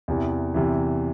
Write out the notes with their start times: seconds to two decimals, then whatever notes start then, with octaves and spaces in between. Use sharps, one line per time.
0.08 E2 C3 E3
0.54 E2 C3 E3